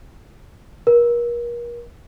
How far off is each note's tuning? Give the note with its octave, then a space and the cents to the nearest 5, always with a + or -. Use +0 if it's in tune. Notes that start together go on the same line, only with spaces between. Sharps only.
A#4 +35